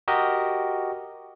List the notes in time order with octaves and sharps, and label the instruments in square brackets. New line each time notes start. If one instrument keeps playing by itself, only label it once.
[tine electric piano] F#4 G4 A#4 D#5